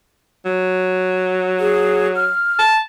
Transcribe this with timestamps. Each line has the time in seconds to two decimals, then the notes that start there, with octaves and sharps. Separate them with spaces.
0.45 F#3
1.60 G#4
2.16 F6
2.59 A5